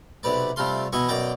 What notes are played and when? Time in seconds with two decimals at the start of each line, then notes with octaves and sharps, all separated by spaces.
0.23 B1 C3 B4 D5
0.56 C3 G3 A3 F4 C6
0.93 B2 E3 E4 D#5 C#6
1.08 F#2 B2 D5 G5 D6